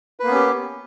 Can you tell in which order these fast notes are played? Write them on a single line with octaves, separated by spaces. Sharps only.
B4 A#3 B3 C#4 G4